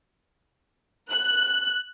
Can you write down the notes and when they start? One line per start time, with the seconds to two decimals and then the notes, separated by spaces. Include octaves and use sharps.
1.11 F#6